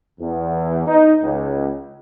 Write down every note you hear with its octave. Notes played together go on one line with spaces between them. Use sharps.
E2
D#4
C#2